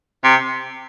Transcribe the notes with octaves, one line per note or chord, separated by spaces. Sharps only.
C3